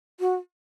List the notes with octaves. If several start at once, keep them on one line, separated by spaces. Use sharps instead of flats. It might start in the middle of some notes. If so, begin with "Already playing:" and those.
F#4